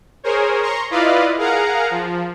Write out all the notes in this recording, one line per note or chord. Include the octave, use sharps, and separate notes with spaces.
G#4 A#4 C5 C#5
A#5 C6 C#6
E4 F4 B4 D5 D#5 F5
G#4 A#4 F5 F#5 A#5
F3